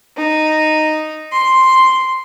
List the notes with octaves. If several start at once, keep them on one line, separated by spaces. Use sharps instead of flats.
D#4
C6